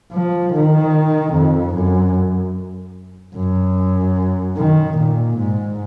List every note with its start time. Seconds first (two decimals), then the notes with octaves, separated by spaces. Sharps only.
0.13 F3
0.53 D#3
1.34 F2
1.75 F#2
3.36 F#2
4.57 D#3
4.98 A#2
5.38 G#2